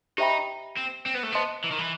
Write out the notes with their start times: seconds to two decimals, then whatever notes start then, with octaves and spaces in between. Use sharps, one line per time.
0.18 D#4 G4 C5 E5 G5 B5
0.77 C4
1.06 C4
1.14 B3
1.23 A3
1.32 B3 C5 D#5 A5 C6
1.64 E3
1.71 D#3
1.78 E3